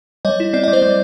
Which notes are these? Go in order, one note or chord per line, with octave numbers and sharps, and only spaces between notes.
G3 C#5 D#5
E4
C4 D5
G3 D#5
C5 D5
G3